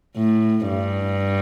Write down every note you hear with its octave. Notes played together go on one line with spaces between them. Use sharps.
A2
G2